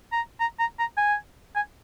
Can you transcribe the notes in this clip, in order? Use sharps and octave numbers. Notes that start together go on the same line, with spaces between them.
A#5
A#5
A#5
A#5
G#5
G#5